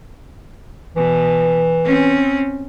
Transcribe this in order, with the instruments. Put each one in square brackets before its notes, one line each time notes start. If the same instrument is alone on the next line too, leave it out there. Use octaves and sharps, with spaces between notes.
[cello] B2 [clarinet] E3
[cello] C4 C#4